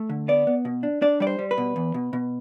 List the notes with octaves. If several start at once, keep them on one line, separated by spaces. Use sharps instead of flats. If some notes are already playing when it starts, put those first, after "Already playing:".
Already playing: A3
D3
B3 D5
B3
B2
D4
D4 D5
G3 D5
C5
G3
B4
B2
E2
B2
B2